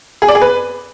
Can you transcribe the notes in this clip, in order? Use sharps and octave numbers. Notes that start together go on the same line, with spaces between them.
G#4
D5
G#4
B4